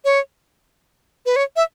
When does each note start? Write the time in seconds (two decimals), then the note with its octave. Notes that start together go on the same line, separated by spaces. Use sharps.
0.05 C#5
1.26 B4
1.36 C#5
1.56 E5